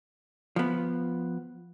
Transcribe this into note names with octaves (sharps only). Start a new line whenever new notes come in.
F3 B3